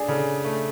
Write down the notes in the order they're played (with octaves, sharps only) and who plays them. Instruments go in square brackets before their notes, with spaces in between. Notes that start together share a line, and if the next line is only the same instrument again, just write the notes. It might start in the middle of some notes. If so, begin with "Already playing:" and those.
Already playing: [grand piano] A3 D4 [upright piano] G#4 D5
[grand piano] C#3 [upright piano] A4
[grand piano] A3